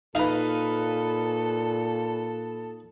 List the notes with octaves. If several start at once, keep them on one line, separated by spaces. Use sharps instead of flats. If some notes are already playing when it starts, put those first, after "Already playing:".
A#2 D#4 A4 B4 F5